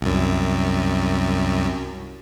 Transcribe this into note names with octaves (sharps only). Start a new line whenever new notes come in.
C2 F#2